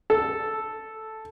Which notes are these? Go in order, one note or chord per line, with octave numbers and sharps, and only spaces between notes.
A4